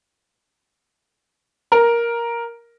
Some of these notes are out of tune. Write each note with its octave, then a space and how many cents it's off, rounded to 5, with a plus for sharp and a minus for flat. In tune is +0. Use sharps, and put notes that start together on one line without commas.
A#4 +5